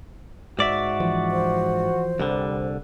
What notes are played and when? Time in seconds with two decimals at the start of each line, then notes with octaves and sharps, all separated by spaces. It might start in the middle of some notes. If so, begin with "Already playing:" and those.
0.59 G#2 F#4 D5 E5
1.00 E3 F3
1.31 C5
2.20 C2 D3 G3